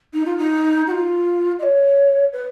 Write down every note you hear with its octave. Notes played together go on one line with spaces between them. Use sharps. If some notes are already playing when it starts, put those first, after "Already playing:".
D#4
F4
D#4
F#4
F4
D#5
C#5
B4